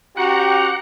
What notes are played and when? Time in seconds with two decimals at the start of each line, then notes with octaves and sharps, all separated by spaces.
0.17 C#4 F#4 G4 F#5 G5 A#5